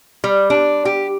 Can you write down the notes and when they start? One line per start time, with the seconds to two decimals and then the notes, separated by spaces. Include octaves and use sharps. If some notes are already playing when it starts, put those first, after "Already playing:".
0.24 G3
0.50 D4
0.85 G4